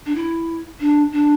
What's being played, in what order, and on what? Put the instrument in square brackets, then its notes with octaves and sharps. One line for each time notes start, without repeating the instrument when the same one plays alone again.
[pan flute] D4
E4
D4
D4